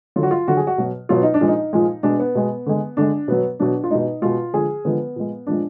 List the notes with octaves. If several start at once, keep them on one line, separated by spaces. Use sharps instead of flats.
D3 F#3 F4
F#4
F4
D3 F#3 F#4
G#4
F#4
B2 F#3
B2 F#3 F4
D#4
D4
A#2 F3 G#3
D#4
A#2 F3 G#3
B2 G#3 D4
B3
B2 G#3
D3 G#3
D3 G#3 D4
B2 F#3 B3
B2 F#3 D4
F4
B2 G#3 D#4
B2 G#3 F4
D3 F3 G#3 G#4
D3 F3 G#3 B3
A#2 F3 G#3
A#2 F3 G#3 D4